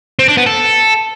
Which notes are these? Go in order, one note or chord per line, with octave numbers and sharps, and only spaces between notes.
C4
D4
B3
A4